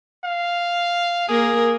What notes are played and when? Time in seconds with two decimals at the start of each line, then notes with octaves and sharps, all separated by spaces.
0.24 F5
1.28 A#3 G#4 A#4